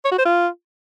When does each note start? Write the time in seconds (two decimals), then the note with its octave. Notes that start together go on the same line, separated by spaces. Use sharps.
0.05 C#5
0.12 F#4
0.18 C5
0.25 F4